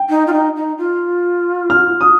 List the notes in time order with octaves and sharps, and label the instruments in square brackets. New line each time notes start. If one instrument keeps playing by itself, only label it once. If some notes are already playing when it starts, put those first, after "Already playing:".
Already playing: [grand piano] G5
[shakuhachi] D#4
F4
D#4
D#4
F4
[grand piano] F6
D#6